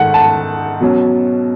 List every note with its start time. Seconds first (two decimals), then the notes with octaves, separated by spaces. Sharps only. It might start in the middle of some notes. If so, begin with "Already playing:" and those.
Already playing: G#2 D#3 A3 F#5
0.14 A5
0.80 B2 F#3 C#4